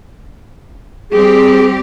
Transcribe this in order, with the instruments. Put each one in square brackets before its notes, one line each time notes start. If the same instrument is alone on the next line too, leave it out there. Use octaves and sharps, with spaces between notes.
[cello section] G3 C4 G4 [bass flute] G#4